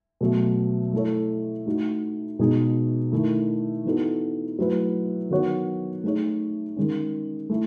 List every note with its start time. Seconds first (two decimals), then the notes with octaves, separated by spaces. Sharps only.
0.21 B2 F#3 A3
0.93 A3 E4 A4 C#5
1.66 A3 D#4 F#4
2.39 B2 G#3 D#4 G#4
3.12 D#3 A3 E4
3.85 E3 B3 D#4 F#4 A4
4.59 F#3 A3 E4 B4
5.31 D#3 F#3 B3 F#4 C#5
6.04 A3 D#4 G#4 C#5
6.76 D#3 G#3 C#4
7.50 A3 E4